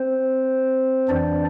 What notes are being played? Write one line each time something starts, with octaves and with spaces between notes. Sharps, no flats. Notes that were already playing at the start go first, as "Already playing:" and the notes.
Already playing: C4 C5
F2 E3 D4 D5